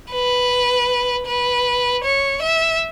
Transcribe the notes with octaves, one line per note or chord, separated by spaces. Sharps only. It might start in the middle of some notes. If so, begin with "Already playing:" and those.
B4
B4
C#5
E5